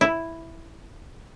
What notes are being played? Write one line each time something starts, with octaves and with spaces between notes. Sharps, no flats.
E4